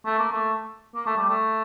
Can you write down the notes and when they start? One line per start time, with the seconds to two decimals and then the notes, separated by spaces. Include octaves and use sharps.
0.05 A3
0.19 A#3
0.32 A3
0.95 A#3
1.06 A3
1.17 G3
1.29 A3